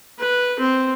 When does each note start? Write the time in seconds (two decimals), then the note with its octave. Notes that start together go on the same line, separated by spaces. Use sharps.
0.19 B4
0.60 C4